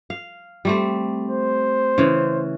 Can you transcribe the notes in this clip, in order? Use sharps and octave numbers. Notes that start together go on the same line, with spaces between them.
F5
G3 A3 C4
C5
C#3 E3